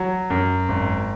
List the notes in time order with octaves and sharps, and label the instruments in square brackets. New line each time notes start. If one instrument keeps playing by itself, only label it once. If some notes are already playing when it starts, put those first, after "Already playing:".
Already playing: [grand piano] F#3
F#2
G#1